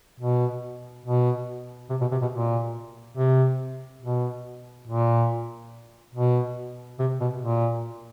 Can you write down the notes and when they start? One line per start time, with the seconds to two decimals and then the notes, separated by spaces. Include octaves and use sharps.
0.20 B2
1.05 B2
1.90 C3
2.01 B2
2.12 C3
2.22 B2
2.32 A#2
3.17 C3
4.02 B2
4.88 A#2
6.15 B2
6.99 C3
7.21 B2
7.42 A#2